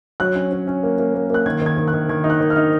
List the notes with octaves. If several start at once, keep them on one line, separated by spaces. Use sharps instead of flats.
F#3 F#6
C#4
C#4
C#4
A#3
A#3
A#3
A#3 F#6
D#3 G#6
D#3 G#6
D#3
F#6
D#3
D#3 G#6
D#4
F#6
D#3
F6
D#4